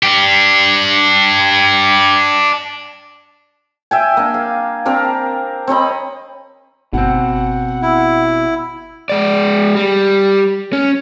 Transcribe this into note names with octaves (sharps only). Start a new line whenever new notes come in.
D4 G4
E5 G5 G#5
A#3 D4
F5
C4 D4 A#4 D5
C4 C#5 D#5 B5
G1 B2 C4 F#5
E4
G#3 D5
G3
C#4